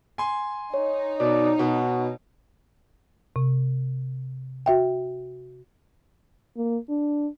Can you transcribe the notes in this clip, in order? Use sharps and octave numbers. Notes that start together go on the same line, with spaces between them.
G#5 C6
D#4 C#5
B2 D5
B2 F#4
C3
F#4 E5 G5
A#3
D4